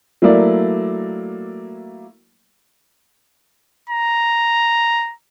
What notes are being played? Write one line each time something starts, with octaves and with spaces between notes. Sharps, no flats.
F#3 A3 A#3 E4 D5
A#5